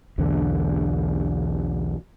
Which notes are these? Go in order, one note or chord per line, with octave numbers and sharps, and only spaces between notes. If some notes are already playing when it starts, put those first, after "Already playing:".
B1 E2 D3